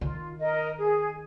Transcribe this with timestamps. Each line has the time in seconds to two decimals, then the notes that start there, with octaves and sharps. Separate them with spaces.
0.01 D#3 F4
0.40 A#4 D#5
0.78 G#4